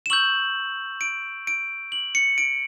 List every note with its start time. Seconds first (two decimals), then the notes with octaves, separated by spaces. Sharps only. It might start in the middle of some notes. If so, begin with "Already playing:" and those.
0.06 E7
0.10 C#6 E6 G6 F#7
1.01 D7
1.47 D7
1.92 F#7
2.15 C#7
2.38 D7